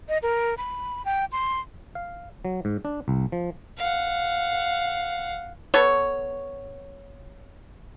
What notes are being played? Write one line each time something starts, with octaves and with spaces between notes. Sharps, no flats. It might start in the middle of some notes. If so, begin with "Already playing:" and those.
D#5
A#4
B5
G5
C6
F5
F#3
G#2
D4
C2
F3
F5 F#5
B3 A4 C#5